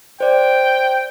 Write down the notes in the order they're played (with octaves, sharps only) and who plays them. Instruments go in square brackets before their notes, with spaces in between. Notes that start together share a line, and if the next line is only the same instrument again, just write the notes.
[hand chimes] C5 D5 [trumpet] G5